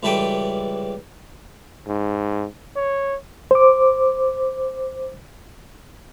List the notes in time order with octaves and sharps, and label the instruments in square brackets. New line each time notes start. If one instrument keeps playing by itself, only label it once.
[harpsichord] C#2 E3 G3 A4 B4 G5
[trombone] G#2
C#5
[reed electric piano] C5 D6